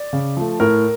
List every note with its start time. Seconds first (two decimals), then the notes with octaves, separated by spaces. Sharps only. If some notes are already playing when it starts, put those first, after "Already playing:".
Already playing: D5
0.13 C#3
0.37 F3 A3
0.60 A2 A#4